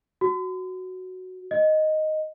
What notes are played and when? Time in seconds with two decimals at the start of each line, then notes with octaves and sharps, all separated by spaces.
0.21 F#4
1.51 D#5